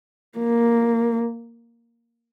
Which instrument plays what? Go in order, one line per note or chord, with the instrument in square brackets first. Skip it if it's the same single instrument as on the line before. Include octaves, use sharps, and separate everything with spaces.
[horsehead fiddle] A#3